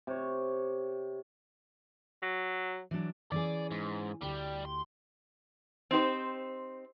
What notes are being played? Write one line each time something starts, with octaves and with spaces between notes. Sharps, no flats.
C3 C#5
F#3
E3 F#3 D4
E3 C#4 G#4 D5
G#2
D2 G3 G4
C6
C4 D#4 G4 C5